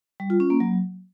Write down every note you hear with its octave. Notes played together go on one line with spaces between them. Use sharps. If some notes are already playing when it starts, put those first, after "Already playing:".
G3
F4
C#4
A#3
F#3